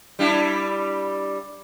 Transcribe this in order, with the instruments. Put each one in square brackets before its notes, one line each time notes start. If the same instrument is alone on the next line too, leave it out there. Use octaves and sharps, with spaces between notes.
[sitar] G3 D4 E4